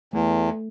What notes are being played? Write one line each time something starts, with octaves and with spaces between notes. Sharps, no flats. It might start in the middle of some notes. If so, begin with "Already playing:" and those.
E2 A3